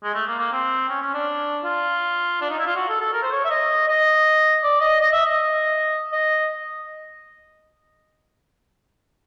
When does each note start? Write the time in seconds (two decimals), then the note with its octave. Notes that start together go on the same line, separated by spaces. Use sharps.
0.04 G#3
0.14 A3
0.28 A#3
0.39 A#3
0.52 C4
0.89 C#4
1.02 C#4
1.14 D4
1.64 F4
2.41 D4
2.50 D#4
2.59 E4
2.67 F4
2.76 F#4
2.89 A4
3.00 A4
3.13 A#4
3.23 C5
3.32 C#5
3.45 E5
3.50 D#5
3.88 D#5
4.63 D5
4.81 D#5
5.01 D#5
5.13 E5
5.26 D#5
6.12 D#5